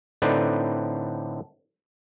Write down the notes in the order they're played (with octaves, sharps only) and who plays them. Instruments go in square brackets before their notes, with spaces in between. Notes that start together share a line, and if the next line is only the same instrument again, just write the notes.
[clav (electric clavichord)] A2 D3 C4 D#4 B4 D5